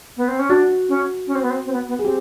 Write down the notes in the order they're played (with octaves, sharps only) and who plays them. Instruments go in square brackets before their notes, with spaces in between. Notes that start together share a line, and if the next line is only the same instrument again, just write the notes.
[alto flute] B3
C4
C#4
[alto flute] D4 [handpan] F#4
[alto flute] C#4
C#4
C4
B3
C4
C4
B3
B3
[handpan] G#4
[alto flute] C4 [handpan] G4